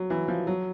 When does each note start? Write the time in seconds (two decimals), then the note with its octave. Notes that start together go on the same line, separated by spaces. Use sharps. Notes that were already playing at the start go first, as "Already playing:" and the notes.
Already playing: F#3
0.10 E3
0.28 F3
0.47 F#3